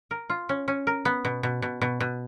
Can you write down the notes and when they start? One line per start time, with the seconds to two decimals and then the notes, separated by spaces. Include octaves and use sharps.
0.11 A#4
0.30 F4
0.49 C#4
0.68 C#4
0.87 A#4
1.05 B3
1.25 B2
1.43 B2
1.62 B2
1.81 B2
2.00 B2